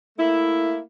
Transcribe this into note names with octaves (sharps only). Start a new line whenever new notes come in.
A3 A#3 E4